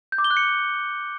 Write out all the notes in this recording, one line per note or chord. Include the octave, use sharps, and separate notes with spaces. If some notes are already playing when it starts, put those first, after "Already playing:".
G6
D6
G7
F#6
C#7